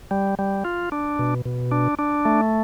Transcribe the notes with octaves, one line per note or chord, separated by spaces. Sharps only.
G3
G3
F4
D4
B2
B2
D4
D4
A3